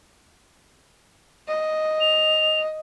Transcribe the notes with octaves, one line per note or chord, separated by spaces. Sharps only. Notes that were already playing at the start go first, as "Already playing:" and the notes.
D#5
F7